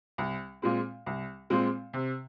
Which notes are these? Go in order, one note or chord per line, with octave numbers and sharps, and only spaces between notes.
C2
A#2 G#3 C4
C2
A#2 G#3 C4
C3